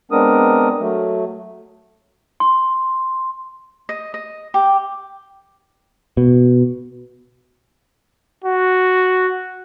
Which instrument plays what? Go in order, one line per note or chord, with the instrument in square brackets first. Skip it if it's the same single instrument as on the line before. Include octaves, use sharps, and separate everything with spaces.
[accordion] G#3 B3 C4 D4 A#4 D#6
F#3 A3
[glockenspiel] C6
[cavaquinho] D#5
D#5
G4
[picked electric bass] B2
[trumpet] F#4